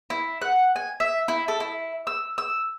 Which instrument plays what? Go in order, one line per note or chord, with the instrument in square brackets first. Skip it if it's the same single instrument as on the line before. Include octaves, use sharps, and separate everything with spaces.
[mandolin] E4
F#5
G#5
E5
E4
A4
E4
E6
E6